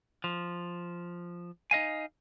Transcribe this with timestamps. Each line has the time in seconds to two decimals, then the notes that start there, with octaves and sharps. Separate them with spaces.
0.24 F3
1.71 D#4 D#5 F5 G#5